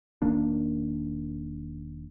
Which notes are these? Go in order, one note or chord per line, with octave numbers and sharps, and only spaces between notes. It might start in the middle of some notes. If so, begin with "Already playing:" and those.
E1 D#3 A#3 D4